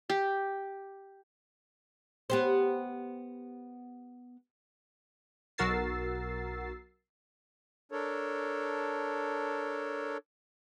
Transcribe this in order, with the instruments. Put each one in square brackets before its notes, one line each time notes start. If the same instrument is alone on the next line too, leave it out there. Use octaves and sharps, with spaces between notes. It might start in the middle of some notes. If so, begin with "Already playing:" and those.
[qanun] G4
[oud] B3 G4 C5
[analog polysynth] B1 F#4 A#4 E6 A6 C7
[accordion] D4 A4 A#4 C#5